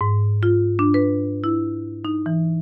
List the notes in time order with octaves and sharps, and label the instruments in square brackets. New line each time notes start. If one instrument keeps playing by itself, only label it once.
[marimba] G#2
F4
D4
B4
E4
D#4
E3